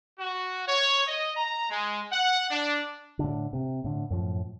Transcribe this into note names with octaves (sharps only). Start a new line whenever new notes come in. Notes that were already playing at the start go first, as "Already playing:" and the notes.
F#4
C#5
D#5
A#5
G#3
F#5
D4
A2 D3
C3
A2 D3
F#2 A2 F3